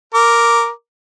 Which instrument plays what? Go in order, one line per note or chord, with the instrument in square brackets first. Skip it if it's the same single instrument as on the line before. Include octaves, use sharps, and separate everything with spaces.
[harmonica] A#4 D6